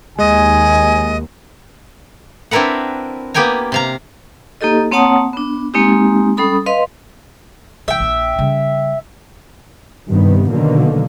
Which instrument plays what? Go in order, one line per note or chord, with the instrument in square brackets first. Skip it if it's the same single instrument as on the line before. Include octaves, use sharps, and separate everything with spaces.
[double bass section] D#2 [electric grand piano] G#3 [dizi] D#5 [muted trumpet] G#5
[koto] C4 D4 E4 A#4 B4 F#5
A#3 B3 G4 G5 G#5 A#5
C3 F5 A#5
[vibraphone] A#3 D#4 G4 A4 D#5
A#3 C4 C#5 F#5 A5 D#6
B3 D4
G#3 A#3 C4 D#4 G4
G3 C#4 A4 B5 D#6
B4 D#5 F5 C6
[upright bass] E1 E3 [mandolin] E5 G5
[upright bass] A#1 F4
C#3 G3
[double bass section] G2 C3 D#3 B3
B2 D3 D#3 F#3 A#3